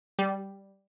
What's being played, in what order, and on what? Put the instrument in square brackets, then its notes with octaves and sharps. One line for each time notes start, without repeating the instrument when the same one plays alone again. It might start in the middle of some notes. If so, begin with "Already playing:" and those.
[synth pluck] G3